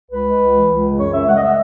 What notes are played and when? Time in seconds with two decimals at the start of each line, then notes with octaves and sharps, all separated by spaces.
0.11 C#2 B4
0.26 G#3
0.40 C#2
0.54 E3
0.70 C#2
0.84 C#3
0.98 F#2 C#5
1.13 F#2 E5
1.27 G#3 F#5
1.36 D#5
1.42 G#3 E5